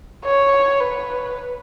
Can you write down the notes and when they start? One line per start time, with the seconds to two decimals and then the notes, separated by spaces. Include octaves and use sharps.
0.25 C#5
0.81 B4